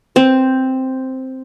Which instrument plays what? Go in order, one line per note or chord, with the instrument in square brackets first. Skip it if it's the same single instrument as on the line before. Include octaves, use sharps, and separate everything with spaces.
[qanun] C4